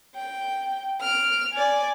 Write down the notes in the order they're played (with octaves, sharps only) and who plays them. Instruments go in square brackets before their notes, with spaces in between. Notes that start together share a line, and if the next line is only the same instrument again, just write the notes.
[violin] G5
F6 D7
D5 G#5